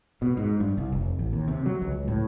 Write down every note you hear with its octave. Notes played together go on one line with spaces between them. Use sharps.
B2
G#2
G2
C2
F1
A1
D#2
C3
F#3
C#2
A2